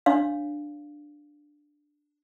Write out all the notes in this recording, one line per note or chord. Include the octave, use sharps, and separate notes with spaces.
D4 C#5 F5